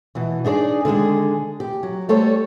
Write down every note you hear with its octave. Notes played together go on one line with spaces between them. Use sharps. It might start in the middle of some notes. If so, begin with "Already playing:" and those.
B2 E3
D4 D#4 G#4 C#5 D5
D3 D#3 G#3 G#4
G4
F#3
G3 A3 A4 C5 C#5